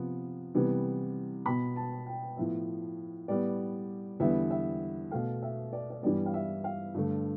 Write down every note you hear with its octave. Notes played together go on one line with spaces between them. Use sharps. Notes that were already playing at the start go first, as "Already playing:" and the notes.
Already playing: C3 F3 B3
C3 E3 G3 B3
B2 B3 B5
A5
G5
A2 F3 B3 E5
A2 G3 B3 D5
E2 D3 G3 B3 E5
E5
B2 A3 F5
E5
D5
D5
G2 E3 G3 B3 D5
F5
E5
F5
G2 D3 A3